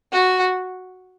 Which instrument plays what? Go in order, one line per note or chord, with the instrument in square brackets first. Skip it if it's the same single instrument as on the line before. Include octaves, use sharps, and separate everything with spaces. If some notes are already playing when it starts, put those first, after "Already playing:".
[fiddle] F#4